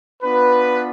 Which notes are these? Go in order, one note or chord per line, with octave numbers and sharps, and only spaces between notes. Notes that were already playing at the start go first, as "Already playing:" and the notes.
B3 D4 F4 B4